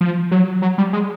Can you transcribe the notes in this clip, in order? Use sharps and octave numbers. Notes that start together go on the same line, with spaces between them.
F3
F#3
F#3
G3
G#3